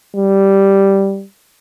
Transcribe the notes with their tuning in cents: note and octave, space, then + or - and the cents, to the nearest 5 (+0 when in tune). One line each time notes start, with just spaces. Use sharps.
G3 -5